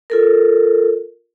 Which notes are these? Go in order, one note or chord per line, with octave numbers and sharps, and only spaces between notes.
F4 A4 A#4